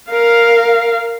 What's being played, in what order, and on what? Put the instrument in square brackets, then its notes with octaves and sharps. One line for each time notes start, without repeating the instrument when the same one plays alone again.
[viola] A#4 F5